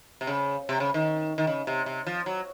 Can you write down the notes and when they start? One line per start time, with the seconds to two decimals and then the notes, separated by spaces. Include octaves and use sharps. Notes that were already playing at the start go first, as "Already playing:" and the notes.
0.21 C3
0.27 C#3
0.69 C3
0.80 C#3
0.94 D#3
1.38 D#3
1.47 C#3
1.67 C3
1.86 C3
2.07 F3
2.26 F#3